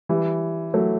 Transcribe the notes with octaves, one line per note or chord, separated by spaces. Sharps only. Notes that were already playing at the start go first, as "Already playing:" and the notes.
E3 G3
F#3 A3